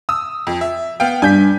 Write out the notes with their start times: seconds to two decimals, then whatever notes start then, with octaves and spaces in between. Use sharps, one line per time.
0.09 D#6 E6
0.47 F2
0.61 E5
1.00 B3 F5 G5
1.22 G2 G#5 G6 B6